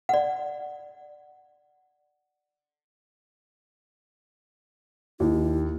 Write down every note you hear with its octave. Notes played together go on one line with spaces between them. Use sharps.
D5 F#5
D#2 E4